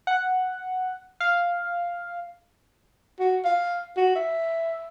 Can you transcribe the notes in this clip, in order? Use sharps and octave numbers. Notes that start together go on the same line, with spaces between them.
F#5
F5
F#4
F5
F#4
E5